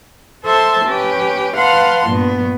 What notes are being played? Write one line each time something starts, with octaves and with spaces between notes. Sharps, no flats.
A4 C5 E5 A5 C6
C#4 G4 B4
B4 F5 F#5 A5 C6
G2 A#2 B3